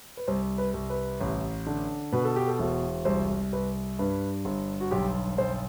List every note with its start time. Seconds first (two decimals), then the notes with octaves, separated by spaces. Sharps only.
0.17 B4
0.27 C2 C5
0.58 B4
0.74 C2
0.90 B4
1.21 A1
1.66 D3
2.12 B2 B4
2.24 A4
2.36 G4
2.47 A4
2.59 E1
3.05 C2 C5
3.53 C2 B4
3.99 G2 B4
4.45 G1
4.80 F#4
4.91 B1 G4
5.38 B1 C5